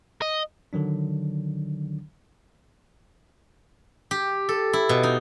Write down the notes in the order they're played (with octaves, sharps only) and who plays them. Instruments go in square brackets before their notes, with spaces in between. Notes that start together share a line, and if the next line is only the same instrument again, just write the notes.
[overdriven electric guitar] D#5
[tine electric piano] D3 D#3 F#3 D4
[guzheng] G4
A4
E4
B2
D#4